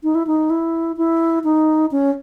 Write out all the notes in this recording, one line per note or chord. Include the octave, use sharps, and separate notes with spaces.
D#4
E4
D#4
E4
E4
D#4
C#4